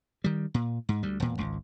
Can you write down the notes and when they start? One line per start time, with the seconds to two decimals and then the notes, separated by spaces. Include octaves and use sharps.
0.24 D#3 G3
0.54 A#2
0.89 G#2
1.03 D2 G3
1.20 E1 A#2
1.38 G#1 C#2